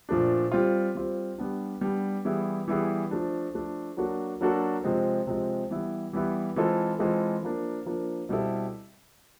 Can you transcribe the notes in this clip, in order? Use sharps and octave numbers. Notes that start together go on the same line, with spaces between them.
A#2 F3 A3 D4
G3 C4 F4
G3 C4 F4
G3 B3 D4
G3 B3 D4
E3 G3 B3 E4 G#4
E3 G3 B3 E4 G#4
F3 A3 D4
F3 A3 D4
F#3 A#3 D4 F#4 A4
F#3 A#3 D4 F#4 A4
C3 F3 G#3 C4
C3 F3 G#3 C4
E3 G3 B3 E4
E3 G3 B3 E4
E3 G#3 C4 F4 A4
E3 G#3 C4 F4 A4
F3 A#3 D4
F3 A#3 D4
B2 G3 C4 E4 A4